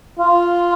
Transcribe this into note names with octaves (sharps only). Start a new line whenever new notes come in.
F4